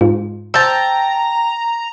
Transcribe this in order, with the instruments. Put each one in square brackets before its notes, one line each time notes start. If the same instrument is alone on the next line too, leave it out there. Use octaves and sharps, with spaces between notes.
[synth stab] G#2 [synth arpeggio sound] F4
[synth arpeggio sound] C5 E6 [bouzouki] G5 A5 [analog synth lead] A#5